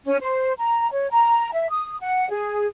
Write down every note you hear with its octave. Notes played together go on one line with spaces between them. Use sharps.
C#4
C5
A#5
C#5
A#5
E5
D#6
F#5
G#4